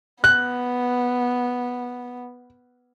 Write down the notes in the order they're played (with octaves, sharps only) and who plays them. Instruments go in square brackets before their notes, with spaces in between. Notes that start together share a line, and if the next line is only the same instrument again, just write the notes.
[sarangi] B3 [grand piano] F#6